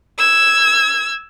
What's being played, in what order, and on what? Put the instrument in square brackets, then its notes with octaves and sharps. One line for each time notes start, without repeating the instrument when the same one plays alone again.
[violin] E6 G#6